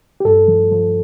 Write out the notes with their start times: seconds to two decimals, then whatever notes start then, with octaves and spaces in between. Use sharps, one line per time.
0.20 G4
0.25 G2 A4
0.48 F3
0.72 F3